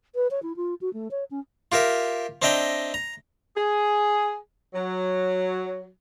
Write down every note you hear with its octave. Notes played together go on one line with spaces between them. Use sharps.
B4
C#5
E4
F4
F#4
A3
C#5
C#4
F4 G4 A#4 E5
C4 D4 D#5 E5 G5 A#5
A#5
G#4
F#3